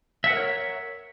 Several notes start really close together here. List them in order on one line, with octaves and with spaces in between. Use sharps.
E5 F#5 B4 A#4 C#5